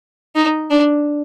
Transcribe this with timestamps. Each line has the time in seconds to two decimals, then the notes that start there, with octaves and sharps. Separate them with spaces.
0.35 D#4
0.71 D4